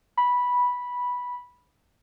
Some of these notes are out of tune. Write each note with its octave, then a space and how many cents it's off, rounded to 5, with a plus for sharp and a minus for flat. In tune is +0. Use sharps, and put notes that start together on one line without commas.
B5 -10